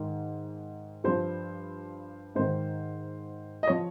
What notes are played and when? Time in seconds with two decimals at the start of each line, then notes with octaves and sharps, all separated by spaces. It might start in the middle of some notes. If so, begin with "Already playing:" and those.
Already playing: G#2 D#3
1.04 G2 F3 C5
2.35 G#2 D#3 C5
3.63 D#5
3.68 F3 C#5